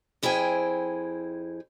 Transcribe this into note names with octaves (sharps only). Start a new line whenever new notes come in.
F2 E4 G#4 C5 G5 G#5